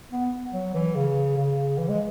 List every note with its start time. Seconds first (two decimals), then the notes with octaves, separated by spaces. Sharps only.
0.12 B3
0.53 F#3
0.74 E3
0.95 C#3
1.37 C#3
1.78 E3
1.89 G#3